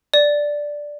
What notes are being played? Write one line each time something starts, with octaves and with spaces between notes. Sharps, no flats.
D5